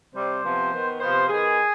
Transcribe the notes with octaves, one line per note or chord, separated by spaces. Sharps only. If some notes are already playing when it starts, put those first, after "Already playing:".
C3 G3 C4 C5
C3 F3 B3
D#3 B3
C3 F3 B3 C5
D#3 B3 G#4